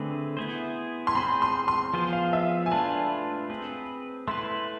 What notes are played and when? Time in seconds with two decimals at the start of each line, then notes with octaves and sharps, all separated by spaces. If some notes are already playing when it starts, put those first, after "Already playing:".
Already playing: D3 A3 C4 G#4 B4
0.37 B3 E4 G#4 C5
1.07 C6
1.15 C4 G#4 C5 B5
1.42 C6
1.68 C6
1.94 F3 B3 F4 G#4 C5
2.13 F5
2.33 E5
2.66 G#5
2.71 A3 D4 F4 B4 A5
3.50 C4 G#4 B4
4.28 A3 E4 B4 C6